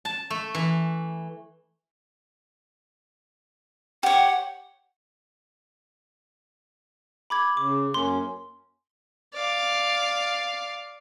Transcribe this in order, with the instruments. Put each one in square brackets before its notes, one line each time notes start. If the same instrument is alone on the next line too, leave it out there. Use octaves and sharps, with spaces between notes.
[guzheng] A5
A3
E3
[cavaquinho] G4 C#5 [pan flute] F#5
[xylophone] B5 D6 G#6
[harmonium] C#3 [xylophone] D6
[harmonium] F#2 A#3 C#4 [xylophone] C6
[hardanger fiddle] D5 F5